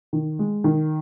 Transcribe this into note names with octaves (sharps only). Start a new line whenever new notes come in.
D#3
G#3
D#3